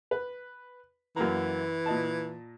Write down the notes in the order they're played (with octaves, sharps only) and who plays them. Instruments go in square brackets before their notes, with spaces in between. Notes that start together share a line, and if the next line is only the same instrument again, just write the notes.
[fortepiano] B4
[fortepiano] F#2 A#3 A#5 [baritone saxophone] E3
[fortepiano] A#2 D#5 A5